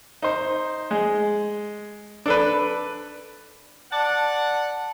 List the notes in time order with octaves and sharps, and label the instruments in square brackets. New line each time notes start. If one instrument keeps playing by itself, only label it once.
[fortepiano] D#4 C5
G#3
D4 A4 B4
[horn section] D5 F#5 [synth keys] A5